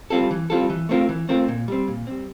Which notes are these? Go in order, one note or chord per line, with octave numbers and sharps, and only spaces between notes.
G3 C4 F4 A4
E3
G3 C4 F4 A4
E3
A3 C4 F4 A#4
E3
A3 C4 F4 A#4
A#2
G3 C4
A#2
G3 C4